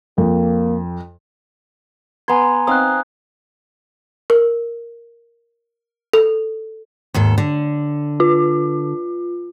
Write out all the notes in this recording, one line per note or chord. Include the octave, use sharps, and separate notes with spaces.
F2 A#3
B3 G#5 A#5 C6 G#6
C4 D#4 F5 D#6 F#6
A#4
A4
D#2 G#2 A4
D3
F4